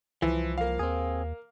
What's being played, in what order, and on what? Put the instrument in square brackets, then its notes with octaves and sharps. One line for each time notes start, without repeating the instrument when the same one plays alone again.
[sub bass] C2 [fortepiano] E3 [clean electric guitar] F3
[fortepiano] A#3 F5
[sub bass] D#2 [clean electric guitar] C4 G#4